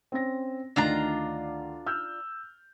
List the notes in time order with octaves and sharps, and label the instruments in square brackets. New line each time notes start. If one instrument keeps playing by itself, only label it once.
[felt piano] C4 C#4 A#6
[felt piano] D2 D#3 A6 [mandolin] D4 F4 A#5
[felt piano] E6 F6 G6